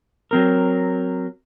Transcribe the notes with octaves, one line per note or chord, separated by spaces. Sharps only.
F#3 C4 A#4